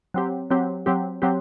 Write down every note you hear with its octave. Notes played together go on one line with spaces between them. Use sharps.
F#3 C4 G4
F#3 C4 G4
F#3 C4 G4
F#3 C4 G4